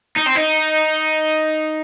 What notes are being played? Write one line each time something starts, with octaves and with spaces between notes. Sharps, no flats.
D#4
C4
D#4